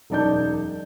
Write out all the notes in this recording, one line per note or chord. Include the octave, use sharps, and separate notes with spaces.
E1 F#2 D#4 D5 A5 G6